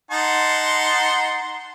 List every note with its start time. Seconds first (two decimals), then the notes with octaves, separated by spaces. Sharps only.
0.11 D#4 F#5 A5 C6